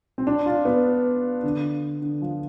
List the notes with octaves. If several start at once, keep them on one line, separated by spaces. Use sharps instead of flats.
C4
D4
F4
B3
D3
D3
F3